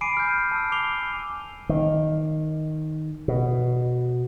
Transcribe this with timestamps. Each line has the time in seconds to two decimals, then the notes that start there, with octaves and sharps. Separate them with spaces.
0.01 G#5 B5 D6 C7 D7 D#7
0.17 F6 G6
0.52 A5 E6
0.72 D6 C7 F7 G7
1.69 D#3
3.28 B2